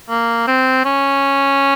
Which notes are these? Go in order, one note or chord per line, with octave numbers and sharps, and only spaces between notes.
A#3
C4
C#4